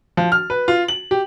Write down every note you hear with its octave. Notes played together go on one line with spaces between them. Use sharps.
F3
F6
B4
F4
F#7
G4